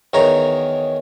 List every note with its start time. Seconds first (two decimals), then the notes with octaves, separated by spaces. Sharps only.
0.14 E2 D#3 C#5 A#5